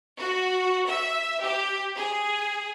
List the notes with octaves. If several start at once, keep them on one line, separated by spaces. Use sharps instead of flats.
F#4
E5
G4
G#4